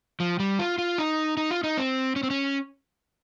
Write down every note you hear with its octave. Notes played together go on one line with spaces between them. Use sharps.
F3
G3
F4
F4
D#4
D#4
F4
D#4
C4
C#4
C4
C#4